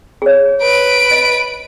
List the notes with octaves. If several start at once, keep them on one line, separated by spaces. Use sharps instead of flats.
G#4 C#5
B4 D7
D#5